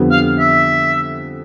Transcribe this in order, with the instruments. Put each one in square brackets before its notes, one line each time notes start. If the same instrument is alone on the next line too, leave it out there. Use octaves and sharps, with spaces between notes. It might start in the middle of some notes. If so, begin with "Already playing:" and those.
Already playing: [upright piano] F2 D3 G3 B3
[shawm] F5
E5